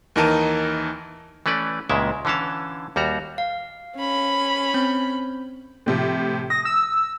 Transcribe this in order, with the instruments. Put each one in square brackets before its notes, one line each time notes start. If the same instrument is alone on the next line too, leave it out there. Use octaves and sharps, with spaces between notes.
[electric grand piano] D#2 E3 D#4 A#4 A5 D#7
[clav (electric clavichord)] E3 A3 C#4 B4 D5
C#2 A#2 C#3 G#3 E4 E5
D3 E3 C#4 F5 A5
D#2 G3 F#4 A#5
[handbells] F5
[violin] C#4 B5
[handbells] C4 G6
[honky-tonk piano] A2 C3 F3
[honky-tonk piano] D#6 [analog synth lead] A#6
[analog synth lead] E6